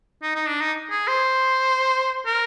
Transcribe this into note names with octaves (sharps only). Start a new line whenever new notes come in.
D#4
D#4
D4
D#4
G#4
C5
A#4